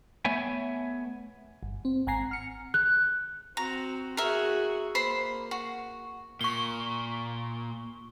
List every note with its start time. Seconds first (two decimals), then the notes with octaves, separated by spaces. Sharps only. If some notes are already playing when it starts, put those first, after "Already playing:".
0.25 A3 B3 C#5 E5 G#5
1.63 G1
1.85 C4
2.07 G#1 F#5 G#5 A#5 C7
2.31 F6 C#7
2.74 F#6
3.57 C4 F#4 A#5
4.17 F#4 G#4 A#4 E5
4.95 A#3 C5 B5 C6
5.51 F#4
6.41 A#2 C#6 G7